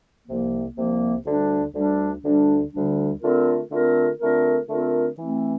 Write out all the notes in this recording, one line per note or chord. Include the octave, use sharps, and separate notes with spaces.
C2 C3 F3 A#3
C2 C3 F3 A#3
D2 D3 G3 D4
D2 D3 G3 D4
D2 D3 G3 D4
D2 D3 G3 D4
D3 A3 C4 F4 A#4
D3 A3 C4 F4 A#4
D3 A3 C4 F4 A#4
D3 A3 C4 F4 A#4
E3 A3 C4